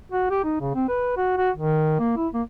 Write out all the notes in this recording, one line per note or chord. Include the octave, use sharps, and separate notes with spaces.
F#4
G4
D#4
C#3
C4
B4
F#4
F#4
D#3
A#3
E4
A#3